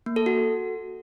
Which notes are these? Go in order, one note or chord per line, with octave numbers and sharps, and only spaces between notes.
A#3
A4
F#4